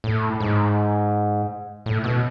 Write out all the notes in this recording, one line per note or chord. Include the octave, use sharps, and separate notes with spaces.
A2
G#2
A2
B2